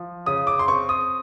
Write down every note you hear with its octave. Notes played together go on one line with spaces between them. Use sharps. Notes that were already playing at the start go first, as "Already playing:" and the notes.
Already playing: F3
C#3 D#6
D6
C6
C4 C#6
D#6